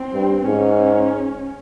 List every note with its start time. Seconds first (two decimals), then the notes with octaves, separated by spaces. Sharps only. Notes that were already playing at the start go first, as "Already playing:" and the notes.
Already playing: C4
0.14 G2
0.46 G#2 C#4